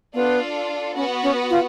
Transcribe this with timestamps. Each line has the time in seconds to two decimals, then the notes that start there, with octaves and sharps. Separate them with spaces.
0.14 B3 D4 F4 A4 D5
0.95 B3 C#4 F#4 B4
1.23 C#4
1.50 F4